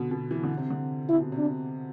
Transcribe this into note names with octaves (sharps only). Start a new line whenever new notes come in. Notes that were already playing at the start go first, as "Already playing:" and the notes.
Already playing: B2 D3
B2
E3
D3
C3
D3
C3 E4
B2
C3
D4